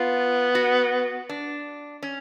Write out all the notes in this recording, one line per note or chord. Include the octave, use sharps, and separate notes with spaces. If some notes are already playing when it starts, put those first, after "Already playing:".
Already playing: B3 F4
F#4
D4
C#4